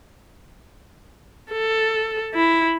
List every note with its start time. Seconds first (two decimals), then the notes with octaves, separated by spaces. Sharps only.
1.52 A4
2.35 E4